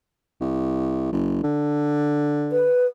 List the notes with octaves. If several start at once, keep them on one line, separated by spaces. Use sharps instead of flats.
C2
F#1
D3
B4